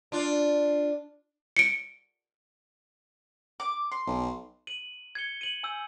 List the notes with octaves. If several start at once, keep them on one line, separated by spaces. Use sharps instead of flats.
D4 F4
C#7 D7
D6
C6
B1
D#7 F#7
G#6 C#7 G7
D#7 F#7
G#5 E6 G6